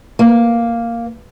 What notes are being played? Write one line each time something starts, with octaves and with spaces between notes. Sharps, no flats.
A#3